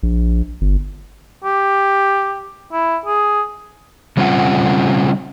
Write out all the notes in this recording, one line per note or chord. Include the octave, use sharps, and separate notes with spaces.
A#1
G1
G4
E4
G#4
C#3 G3 C4 C#4 F4 F#5